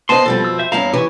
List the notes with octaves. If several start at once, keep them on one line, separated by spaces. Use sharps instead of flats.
B3 C5 D#5 A5 C6
F2 B2 G3 C4 A4
E6
C5 E5
E2 G2 C#4 E4 F5 A#5
E3 G4 C#6